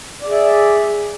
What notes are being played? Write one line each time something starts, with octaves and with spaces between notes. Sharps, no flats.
G#4 D5 E5